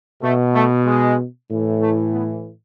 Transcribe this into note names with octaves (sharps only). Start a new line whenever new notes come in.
B2 A3
A3
G#3
A2 E3
A3
B3